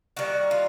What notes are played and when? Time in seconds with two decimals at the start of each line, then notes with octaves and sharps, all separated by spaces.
0.17 D#3 G3 A#3 F#4
0.51 F4